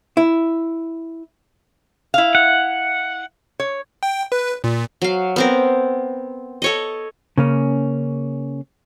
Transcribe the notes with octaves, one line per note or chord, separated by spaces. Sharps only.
E4
E4 F5
F#5
C#5
G5
B4
A#2
F#3 F5
B3 C4 A#4
A4 C#5 D#5
C#3 A#3 C#4